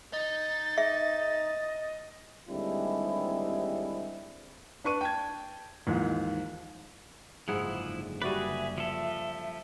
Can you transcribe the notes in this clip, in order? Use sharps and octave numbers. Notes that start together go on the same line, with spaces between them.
D#4 A6
G#4 D#5 E5
D#2 D3 G3 G#3 C4 E4
D4 B4 C#6 D#7
G5 A5 G#6
D#2 G#2 E3 F3
F#1 G#2 D3 F3 E4 G#4 F#5
G3 F#4 G#4 B4 D5 E5
F3 A4